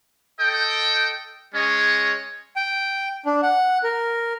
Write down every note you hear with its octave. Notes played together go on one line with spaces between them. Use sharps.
A4 D#5 G5
G#3 C#4 C#5 D#5
G5
D4
F#5
A#4